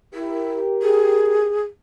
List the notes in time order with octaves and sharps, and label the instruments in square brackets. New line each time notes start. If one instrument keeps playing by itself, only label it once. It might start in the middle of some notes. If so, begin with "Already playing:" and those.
[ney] E4 [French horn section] G4 A#4
[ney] G#4